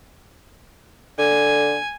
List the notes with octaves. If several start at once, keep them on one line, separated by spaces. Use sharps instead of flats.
D3 G#5